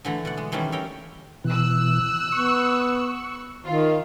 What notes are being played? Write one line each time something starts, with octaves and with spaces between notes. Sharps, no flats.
D3 E3 A3 A#5
B2 D5 F#5
G#3
D#3 E3 G3 A3 C#4 G#4
C#5 E5 F5 G5 A#5 B5
B2 E3 E6 F#6
B3 C#6
D#3 F4